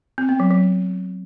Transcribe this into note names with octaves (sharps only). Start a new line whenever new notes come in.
C4
B3
F#3
F#3